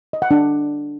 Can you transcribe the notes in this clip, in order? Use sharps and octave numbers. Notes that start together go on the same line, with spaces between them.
D#5
F#5
D4